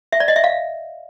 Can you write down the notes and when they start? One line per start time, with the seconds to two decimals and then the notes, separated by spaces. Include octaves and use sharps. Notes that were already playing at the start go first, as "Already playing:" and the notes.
0.12 E5
0.20 D5
0.28 D#5
0.36 E5
0.44 F5